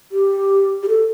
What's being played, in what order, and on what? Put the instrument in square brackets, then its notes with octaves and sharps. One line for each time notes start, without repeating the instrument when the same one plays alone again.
[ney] G4
G4
A4